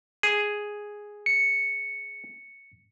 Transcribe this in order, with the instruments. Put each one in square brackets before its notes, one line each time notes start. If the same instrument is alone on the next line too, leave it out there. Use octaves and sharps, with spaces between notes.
[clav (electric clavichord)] G#4
[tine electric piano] C#7